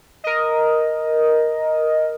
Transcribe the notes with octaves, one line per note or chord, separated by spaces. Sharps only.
A#4 D#5